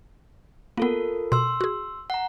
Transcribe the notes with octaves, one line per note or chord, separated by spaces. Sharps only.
A#3 B3 F4 A4 A#4
B2 C6 E6
F#4 G#4
F#5 A#5